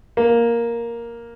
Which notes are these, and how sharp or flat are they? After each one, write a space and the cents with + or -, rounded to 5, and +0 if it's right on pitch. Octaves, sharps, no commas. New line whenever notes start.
A#3 +5